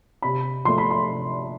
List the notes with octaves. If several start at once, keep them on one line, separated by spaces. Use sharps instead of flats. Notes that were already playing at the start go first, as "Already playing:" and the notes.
C3 B5
F3 A3 C6
B5
C6
C3